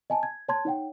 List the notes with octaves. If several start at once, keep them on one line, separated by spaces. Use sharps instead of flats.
D#5 G#5 A5
G#6
C#5 A5 C6 G#6
D#4 C#5 F#5 G5